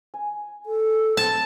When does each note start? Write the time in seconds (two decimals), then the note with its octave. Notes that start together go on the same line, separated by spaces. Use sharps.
0.14 G#5
0.66 A4
1.17 C4 A5